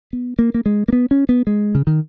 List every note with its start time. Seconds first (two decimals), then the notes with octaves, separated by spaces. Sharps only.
0.13 B3
0.39 A#3
0.54 A#3
0.66 G#3
0.88 A#3
0.93 B3
1.11 C#4
1.29 B3
1.47 G#3
1.75 C#3
1.87 D#3